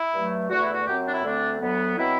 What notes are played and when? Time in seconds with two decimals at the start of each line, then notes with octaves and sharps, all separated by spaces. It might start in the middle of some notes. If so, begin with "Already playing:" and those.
Already playing: E4
0.13 G2 F#3 A3
0.50 E2 D3 A3 F#4
0.62 E4
0.73 F#4
0.86 F#2 F#3 C4 G4
1.06 D4
1.12 E4
1.23 D2 D3 A3 C4 D4
1.60 D2 D3 F#3 B3
1.97 B2 F#3 C4 E4